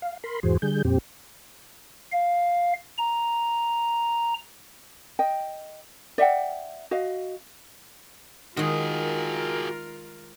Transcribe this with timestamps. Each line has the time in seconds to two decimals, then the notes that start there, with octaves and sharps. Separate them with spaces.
0.02 F5
0.24 A#4 B5 C6
0.43 E2 G#2 E3 F#4 G#4 C5
0.62 D3 G3 G#4 G6
0.85 F2 A#2 C4 G4
2.12 F5
2.98 A#5
5.19 D#5 G5
6.18 D5 E5 F#5 G5
6.91 F#4 D#5 F5
8.57 D#3 G#3 F4 F#4 G#4 A#4